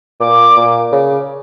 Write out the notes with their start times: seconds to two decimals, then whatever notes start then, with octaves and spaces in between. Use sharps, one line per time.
0.20 A#2 D6
0.57 A#2
0.92 C#3